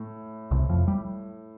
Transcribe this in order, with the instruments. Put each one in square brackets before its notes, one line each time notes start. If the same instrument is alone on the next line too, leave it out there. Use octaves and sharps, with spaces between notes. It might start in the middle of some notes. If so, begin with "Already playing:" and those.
Already playing: [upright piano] A2
[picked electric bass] C2 C3
F2 F3
G3